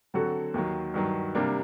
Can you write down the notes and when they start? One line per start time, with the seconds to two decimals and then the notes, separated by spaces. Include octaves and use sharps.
0.14 D3 F#3 C4 F#4 A4
0.54 D#2 D#3 F#3
0.94 G2 D#3 F#3
1.35 C3 G3 A#3 D4